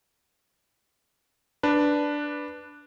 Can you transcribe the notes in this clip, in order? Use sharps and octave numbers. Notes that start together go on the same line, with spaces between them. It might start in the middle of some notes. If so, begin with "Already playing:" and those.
D4 B4